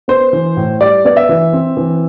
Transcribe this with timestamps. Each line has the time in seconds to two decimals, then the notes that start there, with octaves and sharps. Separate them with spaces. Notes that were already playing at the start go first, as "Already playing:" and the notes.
0.08 B3 C5
0.33 E3
0.57 A2
0.80 G3 D5
1.05 B3 D5
1.16 E5
1.29 E3
1.53 C4
1.77 E3